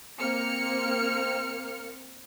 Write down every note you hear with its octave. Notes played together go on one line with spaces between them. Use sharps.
A#3 C4 F6 C#7